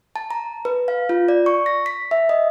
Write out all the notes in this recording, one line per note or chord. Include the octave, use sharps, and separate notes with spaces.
A5
A#5
B4
F5
F4
D5
C#6
A#6
B6
E5
D#5